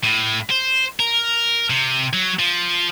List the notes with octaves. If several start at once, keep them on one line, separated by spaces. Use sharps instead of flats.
A2
C5
A#4
C3
F#3
F3